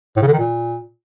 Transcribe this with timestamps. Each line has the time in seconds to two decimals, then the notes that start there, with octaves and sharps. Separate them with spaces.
0.16 A2
0.22 C#3
0.27 D3
0.33 D#3
0.38 A#2